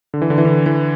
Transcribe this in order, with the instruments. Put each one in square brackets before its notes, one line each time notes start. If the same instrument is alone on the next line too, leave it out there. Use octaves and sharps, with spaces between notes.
[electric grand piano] D3
E3
D3
E3
D3
E3